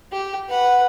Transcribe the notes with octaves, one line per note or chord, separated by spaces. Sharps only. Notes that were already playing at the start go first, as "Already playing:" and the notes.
G4
B4 F#5